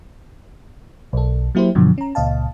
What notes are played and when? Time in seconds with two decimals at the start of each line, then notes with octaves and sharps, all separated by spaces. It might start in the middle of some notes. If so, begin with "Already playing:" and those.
1.13 B1 A4
1.55 F#3 A#3 E4 G4 C5
1.75 G2 B2 D3 F3 F#3
1.98 C#4 A#5
2.15 C#2 A#2 D#5 F5 A5